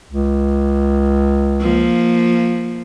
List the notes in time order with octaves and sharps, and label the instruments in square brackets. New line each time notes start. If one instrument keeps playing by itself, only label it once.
[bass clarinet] C#2
[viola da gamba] F3 A#3